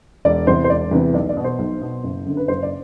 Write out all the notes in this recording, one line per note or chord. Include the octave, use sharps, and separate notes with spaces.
E1 D5
E2 C3 E3 C5
C5
E1 D5
E2 C3 E3 B4
B1 D5
D5
B2
C5
B1
B2
F#1
F#2 D3
B4
F#1 C5
D5